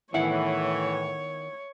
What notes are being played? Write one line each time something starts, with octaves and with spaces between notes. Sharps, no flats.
A2 D#3 E3 B3 E4 C#5 E5 F#5